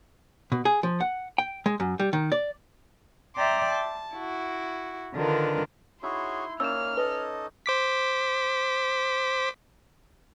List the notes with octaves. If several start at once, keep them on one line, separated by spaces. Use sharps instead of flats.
B2
G#4
F3
F#5
G5
G#3
F#2
G3
D#3
D5
D5 E5 G5 A#5 C6 D6
A5
E4 F#4
D3 D#3 D4 F4 A#4 B4
D#4 E4 F#4 G#4 C#5 C6
A#3 C#4 D#4 D5 E6 F6 E7
A4 B4 D#5
C5 D6 B6